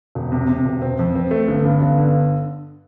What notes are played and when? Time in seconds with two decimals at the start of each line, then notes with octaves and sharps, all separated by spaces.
0.15 E1
0.32 C3
0.49 C3
0.65 E1
0.82 C4
0.99 F2
1.15 C4
1.31 A3
1.48 G1
1.64 G2
1.81 G1
1.98 D3